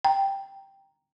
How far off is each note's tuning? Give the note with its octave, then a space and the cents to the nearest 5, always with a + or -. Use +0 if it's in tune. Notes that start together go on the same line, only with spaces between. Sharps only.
G5 +0 A#5 +0